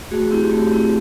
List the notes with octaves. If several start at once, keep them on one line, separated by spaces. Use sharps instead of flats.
A3 F#4 G#4
C4 E4 G4
A3 G4
C4 E4